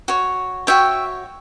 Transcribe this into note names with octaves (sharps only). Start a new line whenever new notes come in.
F#4 C#5
F#4 C#5 E5 G5